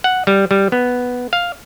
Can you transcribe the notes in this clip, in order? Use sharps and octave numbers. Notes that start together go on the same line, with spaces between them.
F#5
G3
G3
B3
F5